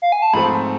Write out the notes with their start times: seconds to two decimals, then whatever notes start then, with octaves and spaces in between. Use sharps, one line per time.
0.02 F5
0.12 G#5
0.22 A5
0.33 G#2 F3 A3 C4 B5